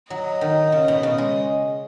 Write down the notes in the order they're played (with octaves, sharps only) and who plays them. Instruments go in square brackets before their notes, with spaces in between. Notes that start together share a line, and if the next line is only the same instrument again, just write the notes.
[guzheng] F#3 [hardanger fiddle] D#5
[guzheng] D#3
C#3
B2
C#3
G#3